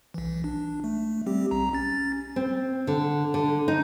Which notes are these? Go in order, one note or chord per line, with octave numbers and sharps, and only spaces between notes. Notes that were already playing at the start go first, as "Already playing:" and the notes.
B1 E3
D4
A3
G3 C4 G4
B1 A#5
C#4 A6
C4
D3
D3
D#4